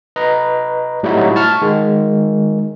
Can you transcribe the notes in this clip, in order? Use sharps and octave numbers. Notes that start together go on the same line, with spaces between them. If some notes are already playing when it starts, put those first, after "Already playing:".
B4 D#5 A#5
A2 F#3 G3 D#4 E4 F#4
A5 C#6 F6
D#3 G#3